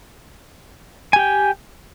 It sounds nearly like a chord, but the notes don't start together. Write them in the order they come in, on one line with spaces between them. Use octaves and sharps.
G#5 G4 G5